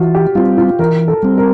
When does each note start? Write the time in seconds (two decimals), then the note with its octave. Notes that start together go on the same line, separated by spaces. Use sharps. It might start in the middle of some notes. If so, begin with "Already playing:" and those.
Already playing: E3 F4 F#4
0.15 G4
0.35 G3 C4 F4
0.58 F4
0.79 E3 A#4
1.08 A4
1.23 G3 C4
1.38 A#4